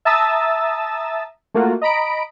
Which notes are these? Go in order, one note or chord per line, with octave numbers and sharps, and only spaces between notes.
E5 A5 A#5 D#6 E6 A6
A3 A#3 F4 F#4
D#5 A#5 B5 D7